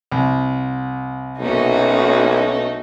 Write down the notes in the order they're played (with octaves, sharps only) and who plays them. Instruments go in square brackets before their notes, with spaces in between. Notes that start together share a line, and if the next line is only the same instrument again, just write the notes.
[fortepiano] C2
[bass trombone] B1 [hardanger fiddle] A3 D#4 [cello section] A#3 C#4 F#4